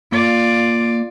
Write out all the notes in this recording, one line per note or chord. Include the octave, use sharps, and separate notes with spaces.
A#3 F4 D5